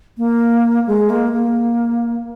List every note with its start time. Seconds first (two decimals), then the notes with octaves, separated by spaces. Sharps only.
0.18 A#3
0.87 G#3
1.10 A#3
1.33 A#3